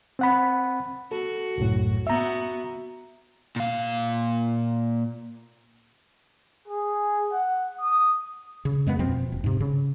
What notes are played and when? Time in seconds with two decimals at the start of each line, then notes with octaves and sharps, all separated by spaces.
0.19 C4 F#5 B5
1.11 F#4 A4
1.58 C2 F#2 A2
2.07 B3 F#4 E5 A#5
3.56 A#2 F5
6.68 G#4
7.32 F#5
7.81 D#6
8.65 C#3
8.86 F#2 G#3 A#3 B3
8.99 F2 B2 F3 C4
9.32 D#1
9.44 G#2 C3
9.60 C#3